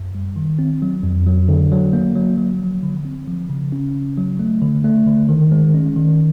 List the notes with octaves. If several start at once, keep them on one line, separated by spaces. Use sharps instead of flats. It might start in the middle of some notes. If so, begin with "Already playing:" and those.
Already playing: F#2
G3
D#3
C4
F#3
F2
F#3
D3
F#3
A#3
F#3
F#3
F3
D3
C4
F3
C#3
C#4
C#3
F#3
A3
D3
A3
D3
D#3
G#3
C#4
D#3